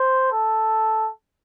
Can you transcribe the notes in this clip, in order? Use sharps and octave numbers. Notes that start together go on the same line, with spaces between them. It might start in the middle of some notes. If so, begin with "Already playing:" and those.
Already playing: C5
A4